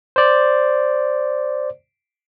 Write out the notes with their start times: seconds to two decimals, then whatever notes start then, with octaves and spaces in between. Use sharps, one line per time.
0.16 C5 D5